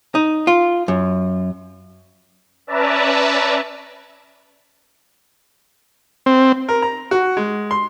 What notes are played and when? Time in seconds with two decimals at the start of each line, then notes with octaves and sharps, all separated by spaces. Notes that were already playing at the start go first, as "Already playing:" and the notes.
0.15 D#4
0.47 F4
0.88 F#2
2.67 C#4 B4 D5 E5 A5 A#5
6.26 C4
6.69 A#4
6.82 A#5
7.11 F#4
7.37 G#3
7.71 C6